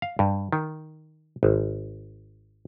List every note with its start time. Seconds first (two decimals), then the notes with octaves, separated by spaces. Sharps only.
0.02 F5
0.19 G2
0.53 D#3
1.43 G#1